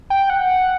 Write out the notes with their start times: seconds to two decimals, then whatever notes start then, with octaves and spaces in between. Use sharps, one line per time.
0.10 G5
0.30 F#5